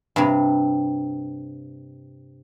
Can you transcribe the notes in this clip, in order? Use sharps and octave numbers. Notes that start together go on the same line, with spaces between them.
G2 C3